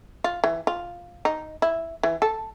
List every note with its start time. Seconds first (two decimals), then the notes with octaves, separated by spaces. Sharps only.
0.24 F4
0.44 E3
0.67 F4
1.25 D#4
1.62 E4
2.03 E3
2.22 A4